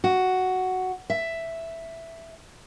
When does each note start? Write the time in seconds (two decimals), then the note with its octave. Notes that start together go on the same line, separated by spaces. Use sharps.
0.04 F#4
1.10 E5